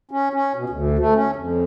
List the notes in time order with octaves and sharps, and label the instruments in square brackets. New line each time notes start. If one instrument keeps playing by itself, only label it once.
[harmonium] C#4
C#4
B2
D2
A3
C#4
F2